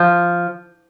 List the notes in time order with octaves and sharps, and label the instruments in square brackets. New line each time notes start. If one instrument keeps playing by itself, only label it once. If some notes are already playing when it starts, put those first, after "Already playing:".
Already playing: [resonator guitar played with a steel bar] F3